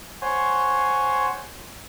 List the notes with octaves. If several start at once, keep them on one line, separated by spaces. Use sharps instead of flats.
C5 C#5 F#5 G#5 C6 C#6